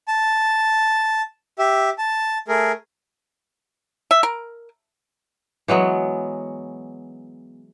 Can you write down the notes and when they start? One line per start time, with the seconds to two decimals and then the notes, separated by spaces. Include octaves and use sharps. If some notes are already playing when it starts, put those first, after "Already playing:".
0.08 A5
1.59 G4 E5
1.98 A5
2.48 A3 G#4 A#4
4.11 E5
4.23 A#4
5.68 E3 F#3 G#3 B3